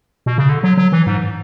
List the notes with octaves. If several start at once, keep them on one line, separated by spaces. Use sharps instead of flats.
B2
C#3
D3
F#3
F#3
E3
G#2